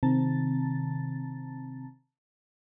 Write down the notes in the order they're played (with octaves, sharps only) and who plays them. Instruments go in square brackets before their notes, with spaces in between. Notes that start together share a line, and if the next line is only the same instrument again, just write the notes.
[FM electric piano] C3 D#3 C4 A5 A#5 A6